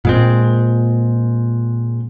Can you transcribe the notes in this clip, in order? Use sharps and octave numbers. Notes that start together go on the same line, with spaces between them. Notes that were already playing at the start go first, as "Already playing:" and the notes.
A#2 G#3 C4